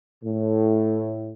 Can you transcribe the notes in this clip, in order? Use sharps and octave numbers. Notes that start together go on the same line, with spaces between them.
A2